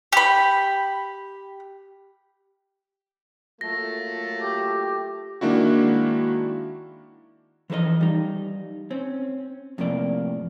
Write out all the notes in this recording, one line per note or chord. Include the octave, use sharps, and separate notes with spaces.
G4 B5
F#3 A3 A#3 F4 A4 A#6
G4
D#3 G#3 A#3 D4 E4 F#4
E3 F3 A4 B4 D#5
G3 D#4
C4 C#4
F2 A2 C3 A#3 D5